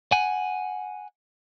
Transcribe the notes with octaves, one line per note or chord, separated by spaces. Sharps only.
F#5 G#5